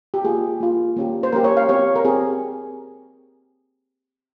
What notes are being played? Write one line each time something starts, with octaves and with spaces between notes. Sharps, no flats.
G4
A#3 F4 G#4
A#3 F4
A#3 C#4 G4
C5
A#3 C#4 G4 A#4
C#5
F5
C4 G4 C#5
A#4
C4 G4 G#4